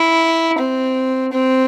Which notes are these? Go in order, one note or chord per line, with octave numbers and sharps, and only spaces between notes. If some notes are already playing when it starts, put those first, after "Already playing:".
Already playing: E4
C4
C4